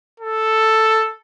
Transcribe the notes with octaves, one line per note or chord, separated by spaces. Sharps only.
A4